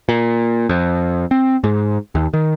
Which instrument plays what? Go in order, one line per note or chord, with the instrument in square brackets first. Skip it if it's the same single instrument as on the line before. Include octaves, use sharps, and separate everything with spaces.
[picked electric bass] A#2
F2
C4
G#2
D#2
D#3